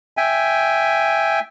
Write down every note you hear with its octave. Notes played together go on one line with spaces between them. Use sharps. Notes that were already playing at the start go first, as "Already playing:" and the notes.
E5 G5 G#5